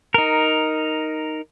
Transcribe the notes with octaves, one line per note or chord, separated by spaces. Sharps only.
D#4 A#4